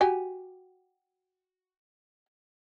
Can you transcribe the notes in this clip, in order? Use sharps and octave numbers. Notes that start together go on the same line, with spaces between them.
F#4 G4 G#5